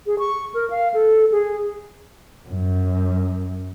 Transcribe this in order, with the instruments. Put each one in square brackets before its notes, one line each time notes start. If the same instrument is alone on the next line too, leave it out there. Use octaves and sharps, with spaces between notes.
[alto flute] G#4
C#6
A#4
F5
A4
G#4
[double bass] F#2